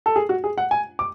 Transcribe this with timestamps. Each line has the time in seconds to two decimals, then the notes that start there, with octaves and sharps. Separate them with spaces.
0.06 A4
0.16 G#4
0.29 F#4
0.44 G#4
0.58 F#5
0.71 G#5
0.99 D6